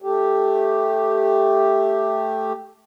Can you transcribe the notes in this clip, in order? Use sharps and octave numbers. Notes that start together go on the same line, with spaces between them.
A3 G4